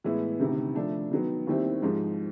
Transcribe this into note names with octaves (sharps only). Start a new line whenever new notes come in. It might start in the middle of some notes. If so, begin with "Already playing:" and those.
A2 E3 G#3 B3 E4
D2 C3 D#3
F3 A3 D4
D#3 F#3 B3
D#2 D#3 G3 C4 E4
G#2 F3 G#3